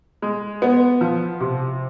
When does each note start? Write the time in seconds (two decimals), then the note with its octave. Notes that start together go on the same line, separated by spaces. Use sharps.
0.22 G#3
0.62 B3
1.01 F3
1.40 C3